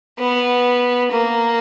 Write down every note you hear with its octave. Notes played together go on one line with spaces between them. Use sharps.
B3
A#3